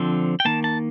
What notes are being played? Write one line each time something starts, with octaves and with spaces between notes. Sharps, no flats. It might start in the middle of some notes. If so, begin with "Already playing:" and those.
Already playing: D3 F3 C4
G5
D#3 A#3 A5
A5